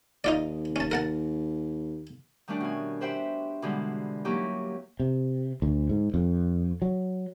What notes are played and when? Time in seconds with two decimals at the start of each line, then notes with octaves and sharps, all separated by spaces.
0.24 D#2 D#4 F4 D5
0.76 C#4 A5
0.92 A#4 F#5 A5
2.48 D#3 G3 A3 C#4 D4
2.60 B2 G#5
3.01 G4 B4 C5 E5 G5 C6
3.62 B2 D3 E3 G3 G#3
4.25 F#3 A#3 C#4 D#4 E4 G4
5.00 C3
5.62 D2
5.89 G#2
6.14 F2
6.82 F#3